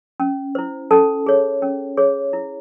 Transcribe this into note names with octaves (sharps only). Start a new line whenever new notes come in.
C#4
E4 C5
C#4 A4 A5
G#4 C#5
C#4
G#4 C#5
E4